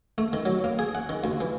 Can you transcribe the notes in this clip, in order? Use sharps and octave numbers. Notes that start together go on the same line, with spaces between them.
A3
D#3
F#3
A#3
G#4
F#5
D#3
D2
E3